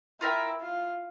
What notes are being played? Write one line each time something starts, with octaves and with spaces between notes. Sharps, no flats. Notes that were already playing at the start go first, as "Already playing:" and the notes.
E4 F4 A#4 E5 G5
F4